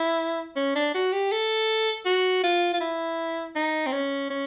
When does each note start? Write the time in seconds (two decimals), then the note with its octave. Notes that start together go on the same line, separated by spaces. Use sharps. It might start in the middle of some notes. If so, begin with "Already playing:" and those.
Already playing: E4
0.56 C#4
0.75 D4
0.94 F#4
1.12 G4
1.32 A4
2.06 F#4
2.44 F4
2.74 F4
2.81 E4
3.56 D#4
3.86 C4
3.92 C#4
4.30 C#4